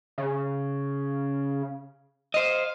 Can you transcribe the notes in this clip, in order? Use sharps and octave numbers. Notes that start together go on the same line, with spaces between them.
C#3
C5 D#5 F5